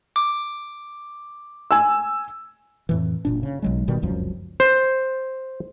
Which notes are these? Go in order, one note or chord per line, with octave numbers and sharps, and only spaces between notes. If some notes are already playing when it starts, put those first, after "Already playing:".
D6
G#5 E6
F2 A2 E3
F#1 A#2 D4
C#3
B1 F#3 G#3
G1 B2 D#3 G3
F1 C#2 F#2 F3
C5